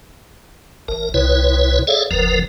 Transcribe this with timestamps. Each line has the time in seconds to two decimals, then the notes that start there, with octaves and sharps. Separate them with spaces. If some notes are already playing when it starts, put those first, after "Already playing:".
0.88 A1 A#4
1.14 C2 B2 E4 B4 C#5
1.87 G#4 A4 C#5 D5 E5 F5
2.11 F#1 D#2 F3 A#4 B4